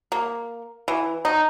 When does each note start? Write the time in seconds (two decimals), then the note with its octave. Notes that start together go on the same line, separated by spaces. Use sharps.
0.12 A#3
0.88 E3
1.25 D#4